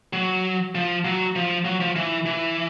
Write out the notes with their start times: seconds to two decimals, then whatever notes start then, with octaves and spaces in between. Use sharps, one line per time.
0.13 F#3
0.75 F3
1.05 F#3
1.36 F3
1.65 F#3
1.80 F3
1.96 E3
2.26 E3